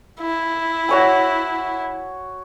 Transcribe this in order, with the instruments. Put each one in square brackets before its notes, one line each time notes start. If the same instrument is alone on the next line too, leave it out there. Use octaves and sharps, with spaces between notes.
[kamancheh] E4
[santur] F#4 C#5 G#5